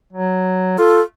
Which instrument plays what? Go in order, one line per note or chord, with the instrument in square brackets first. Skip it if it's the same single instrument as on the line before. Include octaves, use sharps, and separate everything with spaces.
[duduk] F#3
[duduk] F4 [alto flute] A4